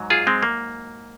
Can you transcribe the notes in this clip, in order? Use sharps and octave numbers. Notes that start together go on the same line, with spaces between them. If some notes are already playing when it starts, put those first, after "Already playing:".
Already playing: G#2 F#3
F4 G#4
G#3 C4
A#3